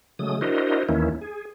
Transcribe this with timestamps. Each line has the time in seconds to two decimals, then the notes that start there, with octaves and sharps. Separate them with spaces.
0.19 C#3 F#3 G#3 A3 D#6
0.41 D4 E4 F#4 A#4 C5 D#5
0.89 D#2 D#3 E3 A#3 C#4 E4
1.21 G#4